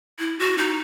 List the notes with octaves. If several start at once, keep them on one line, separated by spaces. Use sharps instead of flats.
E4
F#4
D#4